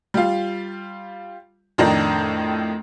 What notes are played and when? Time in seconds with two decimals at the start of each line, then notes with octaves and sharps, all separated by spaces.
0.14 G3 F4
1.78 F2 A2 D#3 D4 D#4